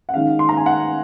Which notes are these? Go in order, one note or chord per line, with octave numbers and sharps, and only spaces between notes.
F#5
D#3 G#3 C#4 F5
C6
A#5
G#5
F#5